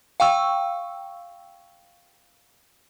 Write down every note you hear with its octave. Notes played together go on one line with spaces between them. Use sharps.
F5 G5 C#6 E6